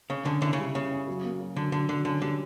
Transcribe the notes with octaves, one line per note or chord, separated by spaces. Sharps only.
C#3 C#4
D3 C#4
D3 E4
C#3
G3
C#3 C#4
C#4
F#3
A#3
F#3
D3 F#3
D3 F#3
D3 F#3
D3 C#4
D3 G3